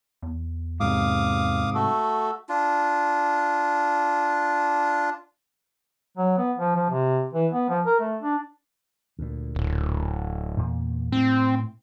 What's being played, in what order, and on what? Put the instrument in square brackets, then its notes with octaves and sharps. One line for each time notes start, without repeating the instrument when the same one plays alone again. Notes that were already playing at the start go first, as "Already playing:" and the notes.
[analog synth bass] E2
[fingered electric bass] G#2 C3 [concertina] F5 D6 D#6
[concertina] A3 F#4 A4
[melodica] D4 F4
[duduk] F#3
B3
F3
F3
C3
E3
B3
F3
A#4
A3
D4
[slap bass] D2 A#2
[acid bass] D1
[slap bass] E2 A#2 A#3
[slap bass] A2 [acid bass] C4